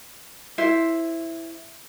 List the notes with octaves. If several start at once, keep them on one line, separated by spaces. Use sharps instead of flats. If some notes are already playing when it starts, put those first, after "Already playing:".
E4 C5 E5